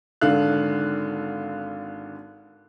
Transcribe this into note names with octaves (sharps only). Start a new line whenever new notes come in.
G#1 D3 A4 F5 F#6